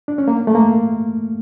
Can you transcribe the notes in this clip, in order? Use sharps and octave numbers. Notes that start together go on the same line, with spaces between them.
D4
C#4
A#3
A3
A#3